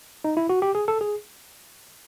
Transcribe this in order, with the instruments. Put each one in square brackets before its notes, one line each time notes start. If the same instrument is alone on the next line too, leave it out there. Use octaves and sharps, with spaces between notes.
[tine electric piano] D#4
E4
F#4
G4
G#4
A4
G#4